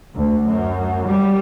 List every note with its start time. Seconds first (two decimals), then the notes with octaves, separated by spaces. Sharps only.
0.15 D2
0.46 F#2
1.08 G3